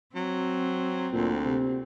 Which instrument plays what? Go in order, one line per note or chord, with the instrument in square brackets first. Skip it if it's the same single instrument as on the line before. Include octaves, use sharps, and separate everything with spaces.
[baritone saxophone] F#3 [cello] C4
[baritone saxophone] D2 [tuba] A#2
[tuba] C3